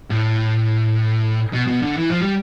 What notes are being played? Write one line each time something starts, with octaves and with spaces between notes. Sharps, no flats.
A2
B2
B2
D3
E3
F3
G3